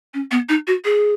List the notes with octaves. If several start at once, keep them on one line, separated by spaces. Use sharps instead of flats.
C#4
B3
D#4
F#4
G#4